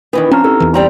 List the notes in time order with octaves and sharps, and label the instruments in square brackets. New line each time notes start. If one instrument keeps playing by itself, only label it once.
[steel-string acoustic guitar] D#3 E3 B3 [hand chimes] D4
[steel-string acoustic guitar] F3 A5 [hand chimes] C4 A#5 F6 [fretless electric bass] C#4
[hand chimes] D#4 E4 G4 [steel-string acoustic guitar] A4
[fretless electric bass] E2 E3
[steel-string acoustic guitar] G3 C4 A#5